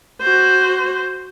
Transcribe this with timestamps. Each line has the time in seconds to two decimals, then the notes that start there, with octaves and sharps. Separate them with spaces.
0.22 F#4 C5